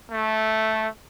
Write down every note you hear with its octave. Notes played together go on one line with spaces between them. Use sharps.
A3